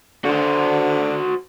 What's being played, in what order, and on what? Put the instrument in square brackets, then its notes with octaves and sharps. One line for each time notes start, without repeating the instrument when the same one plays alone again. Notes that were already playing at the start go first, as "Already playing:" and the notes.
[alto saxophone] D3 [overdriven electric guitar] F#4 C5